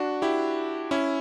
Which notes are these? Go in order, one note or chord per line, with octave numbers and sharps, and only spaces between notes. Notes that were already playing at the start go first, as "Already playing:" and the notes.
Already playing: D4 F#4
E4 G4
C#4 E4